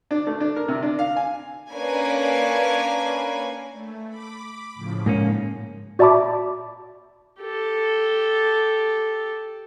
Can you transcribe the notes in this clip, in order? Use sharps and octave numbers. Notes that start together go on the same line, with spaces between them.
D4
A3
D4
A#4
C3
D4
F5
G#5
A#3 C#4 D4 B4 G#5
A3
B5 D6
A2 C#3 F3
G#2 A#3 C#4
F#4 D5 E5 A5 B5 D6
G4 A4